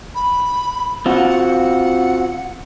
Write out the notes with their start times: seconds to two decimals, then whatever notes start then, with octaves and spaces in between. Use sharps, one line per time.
0.15 B5
1.06 C4 F4 F#4 F#5
1.45 F#5